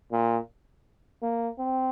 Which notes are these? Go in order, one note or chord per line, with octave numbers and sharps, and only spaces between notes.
A#2
A#3
C4